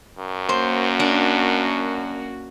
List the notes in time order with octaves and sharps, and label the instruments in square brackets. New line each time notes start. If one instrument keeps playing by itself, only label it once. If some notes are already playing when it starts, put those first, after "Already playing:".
[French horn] F#2
[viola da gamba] A#3 C#4 F#4 [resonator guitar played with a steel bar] C5
[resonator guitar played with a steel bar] D4